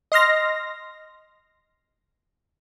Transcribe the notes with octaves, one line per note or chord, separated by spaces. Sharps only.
D#5 C6 F6 A#6